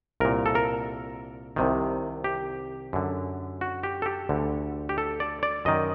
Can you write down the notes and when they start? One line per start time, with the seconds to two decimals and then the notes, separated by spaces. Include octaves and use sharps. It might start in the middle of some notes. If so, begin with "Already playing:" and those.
0.20 C2 A#2 A#4
0.46 A4
0.55 A#4
1.56 C2 C3 D#3
2.24 G4
2.93 F#2 D3
3.61 F#4
3.83 G4
4.02 A4
4.06 G4
4.29 D2 D3
4.89 G4
4.98 A4
5.20 D5
5.43 D5
5.65 F#2 D#3 D#5